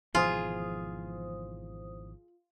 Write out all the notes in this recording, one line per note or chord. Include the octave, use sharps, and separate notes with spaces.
G#1 B2 E3 F3 F4 G#4 C5 D#6